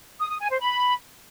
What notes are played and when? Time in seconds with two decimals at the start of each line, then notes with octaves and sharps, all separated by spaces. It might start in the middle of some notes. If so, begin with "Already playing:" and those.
0.20 D#6
0.30 D#6
0.41 G#5
0.51 C5
0.61 B5